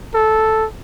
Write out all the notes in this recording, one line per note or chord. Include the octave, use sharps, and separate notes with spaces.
A4